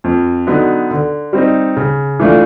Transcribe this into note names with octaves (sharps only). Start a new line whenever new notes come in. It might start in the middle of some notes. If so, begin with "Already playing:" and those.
F2
D3 F#3 B3 D#4
D3
G3 C4 D#4
C#3
E3 A3 D4 F4